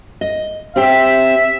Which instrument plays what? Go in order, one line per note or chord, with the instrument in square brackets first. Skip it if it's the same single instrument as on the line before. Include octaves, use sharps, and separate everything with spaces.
[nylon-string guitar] D#5
[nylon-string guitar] C4 G4 G5 [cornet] E5